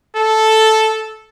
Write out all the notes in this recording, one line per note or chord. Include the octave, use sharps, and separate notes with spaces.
A4